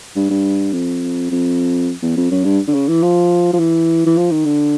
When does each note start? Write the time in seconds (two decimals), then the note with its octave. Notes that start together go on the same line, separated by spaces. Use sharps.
0.16 G2
0.30 G2
0.73 F2
1.31 F2
2.02 E2
2.17 F2
2.31 F#2
2.44 G2
2.68 D3
2.74 C#3
2.88 E3
3.02 F3
3.53 F3
3.59 E3
4.06 E3
4.17 F3
4.32 D#3
4.45 D3